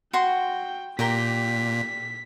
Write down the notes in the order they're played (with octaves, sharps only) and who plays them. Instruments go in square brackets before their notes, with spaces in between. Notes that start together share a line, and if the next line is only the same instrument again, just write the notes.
[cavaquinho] F#4 C6 [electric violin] G5
[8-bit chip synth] A#2 [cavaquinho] G4 A#4 G5 [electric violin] B6